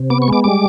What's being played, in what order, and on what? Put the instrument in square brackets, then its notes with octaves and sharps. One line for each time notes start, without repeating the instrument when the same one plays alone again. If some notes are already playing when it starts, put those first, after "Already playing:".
Already playing: [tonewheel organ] C3
B3 D6
C#6
G#3 D6
G3 D6